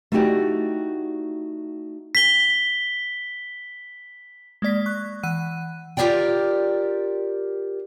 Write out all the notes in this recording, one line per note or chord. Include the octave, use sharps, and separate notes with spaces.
A3 D#4 E4 F#4 G4 D5
B6 G7
G#3 A#3 D5 B6
C#6 F#6
E3 F#5 F#6 D#7
F4 G4 G#4 A#4 D5 G5